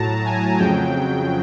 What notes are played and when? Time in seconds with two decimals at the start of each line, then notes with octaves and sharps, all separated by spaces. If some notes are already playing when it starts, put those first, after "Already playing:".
Already playing: A2 F#3 A5 A#5
0.26 G#5
0.59 F2 C#3 F#3 G5